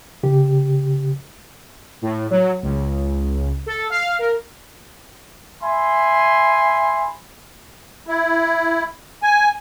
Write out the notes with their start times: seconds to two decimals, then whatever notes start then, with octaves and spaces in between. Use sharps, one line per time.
0.23 C#3 G4
2.02 A2
2.30 F#3
2.63 C#2
3.66 A4
3.90 F5
4.19 A#4
5.63 E5 G#5 B5 C6
8.07 E4
9.23 G#5